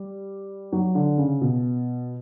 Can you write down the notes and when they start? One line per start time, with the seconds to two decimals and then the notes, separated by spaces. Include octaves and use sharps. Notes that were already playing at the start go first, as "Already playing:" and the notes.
Already playing: G3
0.73 F#3
0.95 D3
1.18 C#3
1.41 B2